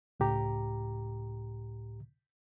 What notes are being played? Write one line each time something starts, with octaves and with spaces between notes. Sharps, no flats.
C#2 A2 G4 A#5